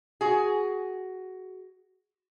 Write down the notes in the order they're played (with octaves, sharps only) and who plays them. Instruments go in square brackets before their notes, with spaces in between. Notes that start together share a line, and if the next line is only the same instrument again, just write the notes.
[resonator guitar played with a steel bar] F#4 G#4